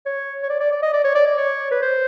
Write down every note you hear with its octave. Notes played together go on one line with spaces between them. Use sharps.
C#5
C#5
D5
D5
D5
D#5
D5
C#5
D5
D5
C#5
B4
C5